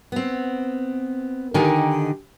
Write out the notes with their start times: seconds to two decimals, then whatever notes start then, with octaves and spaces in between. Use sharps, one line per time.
0.12 B3 C4
1.54 D3 D#3 D#4 G4 G5 G#5